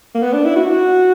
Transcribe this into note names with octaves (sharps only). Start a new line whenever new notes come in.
A#3
B3
D4
E4
F#4